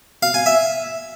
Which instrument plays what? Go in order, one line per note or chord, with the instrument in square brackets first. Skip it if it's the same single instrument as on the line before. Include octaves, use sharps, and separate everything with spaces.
[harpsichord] F5
G#5
E5